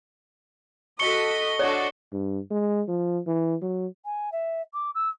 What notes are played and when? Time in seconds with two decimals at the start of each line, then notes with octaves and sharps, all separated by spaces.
0.99 F#4 A4 D#5 C#6 B6 C#7 G7
1.59 D4 F#4 A4 C#5 D5
2.13 G2
2.51 G#3
2.88 F3
3.27 E3
3.62 F#3
4.03 G#5
4.32 E5
4.73 D6
4.94 E6